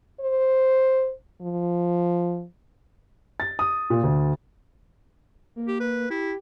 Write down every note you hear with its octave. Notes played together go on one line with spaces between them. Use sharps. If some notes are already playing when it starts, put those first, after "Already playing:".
C5
F3
A6
D#6
A#2
D2
A#3
G4
B4
E4 G4